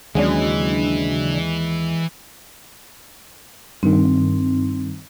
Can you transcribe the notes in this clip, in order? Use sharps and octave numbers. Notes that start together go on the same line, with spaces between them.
D#2 C#3 E3 F#3 G#3 D4
G2 D#3 C4